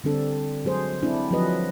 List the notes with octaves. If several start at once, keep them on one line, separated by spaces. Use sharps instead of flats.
D3 G3 C4 D4 A4
F#3 G#3 G#4 C5
G#3 C4 D4 E4
F3 F#3 G#3 G#4 B4 D#5